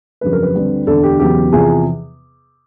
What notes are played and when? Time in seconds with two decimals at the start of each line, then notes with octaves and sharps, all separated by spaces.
0.21 G1 F2 C#3 F#3 B4
0.33 A#4
0.42 B4
0.54 D2 D3 G3 C4
0.87 E1 D2 D3 A4
1.03 G4
1.20 E1 E2 C#3 F#3 B3 G4
1.52 E2 C3 F3 G#4